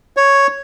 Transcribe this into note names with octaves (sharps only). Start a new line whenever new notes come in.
C#5